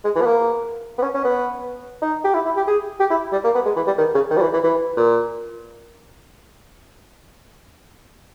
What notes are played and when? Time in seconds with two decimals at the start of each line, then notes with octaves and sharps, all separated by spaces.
0.04 G#3
0.15 E3
0.21 B3
0.26 A#3
0.98 B3
1.02 C#4
1.14 C#4
1.24 B3
2.02 D#4
2.24 G4
2.34 E4
2.45 E4
2.57 G4
2.67 G#4
3.00 G4
3.10 E4
3.32 G3
3.44 A#3
3.55 B3
3.66 G#3
3.76 E3
3.87 G3
3.98 D#3
4.15 C#3
4.31 D#3
4.37 G3
4.42 E3
4.53 E3
4.64 E3
4.97 A#2